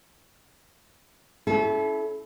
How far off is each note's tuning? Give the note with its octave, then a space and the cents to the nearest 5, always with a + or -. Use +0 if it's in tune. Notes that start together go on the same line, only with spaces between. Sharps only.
C#4 +20 E4 +0 A4 -35